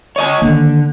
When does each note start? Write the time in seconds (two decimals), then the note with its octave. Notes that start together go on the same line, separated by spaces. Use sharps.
0.16 C#5 D#5 G#5
0.42 D3 D#3 A#3